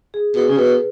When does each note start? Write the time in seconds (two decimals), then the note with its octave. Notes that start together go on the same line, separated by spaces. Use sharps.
0.14 G#4
0.35 B2 G#4
0.49 C#3
0.58 B2 B4